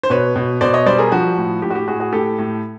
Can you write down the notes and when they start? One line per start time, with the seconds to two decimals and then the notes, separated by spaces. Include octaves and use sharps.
0.03 C5
0.10 B2 B4 C#5
0.36 B2
0.61 B2 C5 D5
0.74 C#5 D#5
0.86 G3 C5 D5
0.98 G#4 A#4
1.12 F3 F#4
1.37 A2
1.62 A2 G4
1.70 F#4
1.75 G4
1.87 A2 F#4 G#4
2.00 F#4 G#4
2.13 A2 G4 A4
2.39 A2